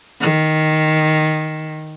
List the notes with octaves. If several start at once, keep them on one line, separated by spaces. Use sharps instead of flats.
D#3